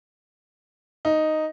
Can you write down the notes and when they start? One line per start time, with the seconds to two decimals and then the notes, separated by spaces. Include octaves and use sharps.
1.05 D#4